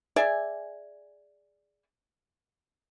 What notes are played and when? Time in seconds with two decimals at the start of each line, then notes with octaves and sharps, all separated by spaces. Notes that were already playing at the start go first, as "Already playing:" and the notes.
0.16 G#4 D5 E5 G#5